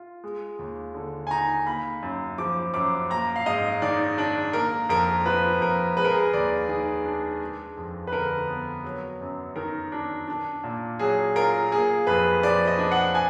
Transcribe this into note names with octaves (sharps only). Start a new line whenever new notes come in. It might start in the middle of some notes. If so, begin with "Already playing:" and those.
Already playing: F4
G#3
D#2
D3
G#5
D#4 A#5
A#3 B5
F#2
F3 D6
F#2 D6
A#3 A#5
F5
G#2 D#5
D#3 D5
D4 D5
A#3 A#4
F2 A#4
F3 B4
F2 A#4
G#3 B4
A#4
G#4
A#4
D#2 D5
D#3 G#4
D4
G#3
F2
B4
D3 A#4
B3
F#3
F#2
D#3 A#4
D4
D4
A#2
F#3 G#4
F4 A#4
A#3 G#4
F2 B4
F3 D5
D#5
D4
F#5
G#5